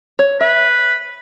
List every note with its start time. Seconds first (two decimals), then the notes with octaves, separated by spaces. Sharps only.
0.19 C#5
0.41 B4 E5